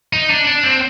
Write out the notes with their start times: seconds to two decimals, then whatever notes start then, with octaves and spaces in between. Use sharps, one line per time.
0.13 D#4
0.30 D4
0.47 D4
0.63 C4